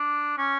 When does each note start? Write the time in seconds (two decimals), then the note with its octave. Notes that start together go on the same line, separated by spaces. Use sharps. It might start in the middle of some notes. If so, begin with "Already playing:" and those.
Already playing: D4
0.38 C#4